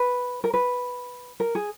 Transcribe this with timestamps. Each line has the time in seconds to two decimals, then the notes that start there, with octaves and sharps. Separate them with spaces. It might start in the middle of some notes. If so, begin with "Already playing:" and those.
Already playing: B4
0.44 A#4
0.54 B4
1.40 A#4
1.55 G#4